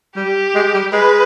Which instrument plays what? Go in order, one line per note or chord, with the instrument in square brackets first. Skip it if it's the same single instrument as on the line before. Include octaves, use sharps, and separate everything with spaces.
[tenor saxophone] G3 [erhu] G4
[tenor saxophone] G#3
G3
[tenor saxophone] G#3 [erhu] B4